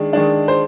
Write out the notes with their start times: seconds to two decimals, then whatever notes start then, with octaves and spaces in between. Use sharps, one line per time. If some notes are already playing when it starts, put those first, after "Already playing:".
Already playing: D#3 G#3 D4
0.13 D#3 G#3 D4
0.48 C5